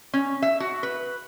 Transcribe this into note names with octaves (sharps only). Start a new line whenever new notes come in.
C#4
E5
F#4
B4